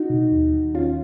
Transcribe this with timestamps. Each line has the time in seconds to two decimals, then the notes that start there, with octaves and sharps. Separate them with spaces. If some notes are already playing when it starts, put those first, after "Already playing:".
Already playing: D#4 F#4
0.10 B2
0.32 D#2
0.53 D#3
0.74 D#2 C#4 F4